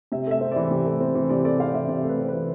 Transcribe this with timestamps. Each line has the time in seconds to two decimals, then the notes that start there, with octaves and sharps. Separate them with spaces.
0.12 C3 E5
0.27 A3 E5
0.41 C4
0.52 E3 D5
0.71 C3
0.86 A3
1.00 C4
1.15 E3
1.29 C3 D5
1.44 A3 D5
1.60 C4 F5
1.74 E3 E5
1.88 C3 D5
2.04 A3
2.09 B4
2.19 C4
2.29 B4
2.34 E3